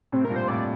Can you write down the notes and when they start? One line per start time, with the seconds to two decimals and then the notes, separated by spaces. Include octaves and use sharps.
0.12 A2 C3 C4
0.25 A#4
0.30 G2 A#2
0.36 C5
0.48 F2 A2 D5